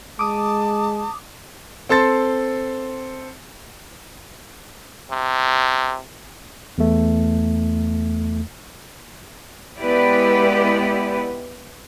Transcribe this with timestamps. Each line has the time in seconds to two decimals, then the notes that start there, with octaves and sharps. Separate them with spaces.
0.19 G#3 A5 D6 D#6
1.89 C4 A4 C6 A6
5.11 C3
6.78 E2 A3
9.78 G#3 B3 E4 G4 B4 D5